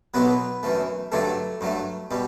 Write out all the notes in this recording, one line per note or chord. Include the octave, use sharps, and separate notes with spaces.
B1 B2 F#3 B3 B4
F#2 E3 A3
G2 D3 F#3 A3 A4
G2 F#3 A3
B2 G3